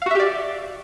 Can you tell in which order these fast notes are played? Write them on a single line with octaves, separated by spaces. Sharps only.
F5 F#4 E5 G4 D5